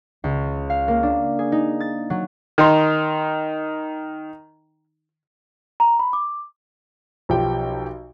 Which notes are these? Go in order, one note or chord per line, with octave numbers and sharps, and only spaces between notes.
C#2
F5
A#3
D4
G#4
D#4
A6
F#3
D#3 D#4 C6
A#5
B5
D6
B1 F3 F4 G4 G5